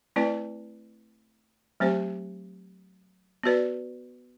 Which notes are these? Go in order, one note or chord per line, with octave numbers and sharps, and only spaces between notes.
A3 C4 E4 B4 D5
F#3 A3 C4 G4 C5
B3 F#4 B4 D5